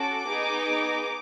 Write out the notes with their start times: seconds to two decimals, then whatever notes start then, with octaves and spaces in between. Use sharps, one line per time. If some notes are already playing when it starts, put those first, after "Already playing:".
Already playing: C#4 F#4 A4 D6
0.29 B3 D#4 G#4